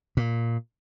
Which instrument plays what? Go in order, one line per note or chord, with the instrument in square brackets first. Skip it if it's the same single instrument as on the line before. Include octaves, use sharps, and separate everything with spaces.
[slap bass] A#2